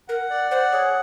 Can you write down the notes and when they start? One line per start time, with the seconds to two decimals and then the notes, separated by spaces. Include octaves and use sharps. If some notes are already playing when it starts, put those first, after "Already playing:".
0.08 A#4 F#5
0.30 D5
0.51 C5 F#5
0.72 G#4 C#5